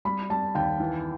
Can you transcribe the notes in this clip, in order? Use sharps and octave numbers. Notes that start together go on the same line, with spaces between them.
G3 B5
G3 A5
D#2 G5
E3